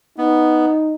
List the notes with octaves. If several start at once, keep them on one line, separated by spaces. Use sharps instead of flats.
B3 D#4